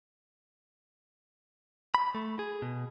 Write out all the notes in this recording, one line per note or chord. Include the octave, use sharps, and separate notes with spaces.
B5
A3
G#4
B2